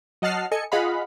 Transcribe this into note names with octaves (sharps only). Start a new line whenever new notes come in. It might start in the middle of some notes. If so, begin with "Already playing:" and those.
F#3 D#5 F#5 A5 F6 C7
A4 D#5 G#5 C#7
F4 G#4 D#5 F5 F#5 B5